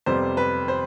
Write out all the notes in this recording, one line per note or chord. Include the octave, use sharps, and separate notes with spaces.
F2 C3 G3 B3 C5
B4
C5